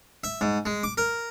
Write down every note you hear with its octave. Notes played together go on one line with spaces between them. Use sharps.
E5
G#2
G#3
D6
A#4